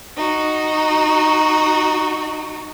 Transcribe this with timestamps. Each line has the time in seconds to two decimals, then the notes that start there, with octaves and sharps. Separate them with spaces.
0.17 D#4 F#4